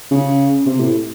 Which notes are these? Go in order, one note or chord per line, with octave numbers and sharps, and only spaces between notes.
C#3
C3
A2